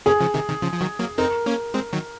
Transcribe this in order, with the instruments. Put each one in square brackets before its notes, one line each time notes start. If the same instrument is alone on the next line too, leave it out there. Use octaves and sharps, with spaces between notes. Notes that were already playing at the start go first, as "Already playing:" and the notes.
[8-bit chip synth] A#3 C#4 [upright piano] G#4
[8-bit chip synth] C#3 F3
C3 D#3
C3 D#3
C#3 F3
F3
D#3 F#3
F#3 A#3
[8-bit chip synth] C4 D#4 [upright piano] A#4
[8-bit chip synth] A#3 C#4
G#3 C4
D#3 F#3